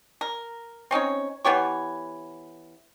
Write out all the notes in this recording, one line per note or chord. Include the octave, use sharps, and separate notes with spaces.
A#4
C4 C#4 D#4 C#5
E3 B3 G4 C#5